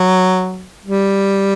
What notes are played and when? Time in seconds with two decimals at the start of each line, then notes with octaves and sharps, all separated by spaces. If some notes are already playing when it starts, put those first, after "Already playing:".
Already playing: F#3
0.86 G3